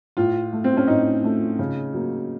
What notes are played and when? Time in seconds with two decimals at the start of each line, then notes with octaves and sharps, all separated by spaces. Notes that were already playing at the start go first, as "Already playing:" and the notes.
0.17 A2 F4
0.53 A3
0.64 C4
0.77 C#4
0.88 A2 D#4
1.24 A3
1.59 C#3
1.94 F#3 A#3